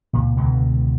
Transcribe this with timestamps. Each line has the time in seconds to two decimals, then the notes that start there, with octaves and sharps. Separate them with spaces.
0.13 C#2 A#2
0.37 C#2 B2 D3 G#3